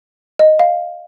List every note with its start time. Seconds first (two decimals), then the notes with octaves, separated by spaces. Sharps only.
0.39 D#5
0.59 F5